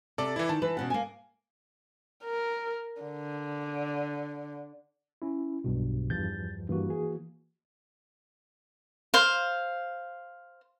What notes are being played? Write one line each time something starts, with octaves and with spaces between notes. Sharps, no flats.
C3 A4 D5
E3 E4 D5
D#3 A5
E3 B4
B2 C#4 F#5
A#3 G#5
A#4
D3
C#4 E4
B1 G2 B2
E2 G2 F3 G6 A6
G2 E3 A#3 F#4
G#4
C5 F5